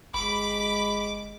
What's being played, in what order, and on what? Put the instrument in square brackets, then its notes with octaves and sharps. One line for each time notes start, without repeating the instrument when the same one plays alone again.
[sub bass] G1 [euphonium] G#3 [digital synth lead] B5 [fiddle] D6